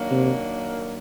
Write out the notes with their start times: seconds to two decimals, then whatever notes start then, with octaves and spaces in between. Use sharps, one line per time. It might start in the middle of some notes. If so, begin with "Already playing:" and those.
Already playing: D#3 F#3 A#3 D4
0.11 C3